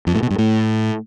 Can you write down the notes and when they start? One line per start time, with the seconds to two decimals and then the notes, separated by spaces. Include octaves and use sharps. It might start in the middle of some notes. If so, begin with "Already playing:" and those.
0.07 F2
0.15 A2
0.23 B2
0.30 G2
0.38 A2